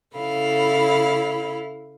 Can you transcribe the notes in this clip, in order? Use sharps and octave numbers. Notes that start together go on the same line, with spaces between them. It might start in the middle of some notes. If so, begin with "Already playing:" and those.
C#3 E4 A4 F5 B5